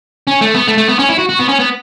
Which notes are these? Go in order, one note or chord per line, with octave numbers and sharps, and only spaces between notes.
C#4
A3
B3
A3
A3
B3
C#4
E4
F#4
F#4
B3
C#4
B3